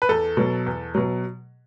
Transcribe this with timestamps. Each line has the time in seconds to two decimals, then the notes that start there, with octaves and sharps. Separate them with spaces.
0.02 B4
0.09 E2 A4
0.37 B2 F#3
0.66 E2
0.95 B2 F#3